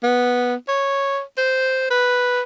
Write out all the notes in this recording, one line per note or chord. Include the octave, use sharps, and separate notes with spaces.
B3
C#5
C5
B4